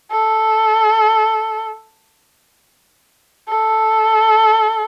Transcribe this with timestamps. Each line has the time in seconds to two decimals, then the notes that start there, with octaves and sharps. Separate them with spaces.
0.11 A4
3.49 A4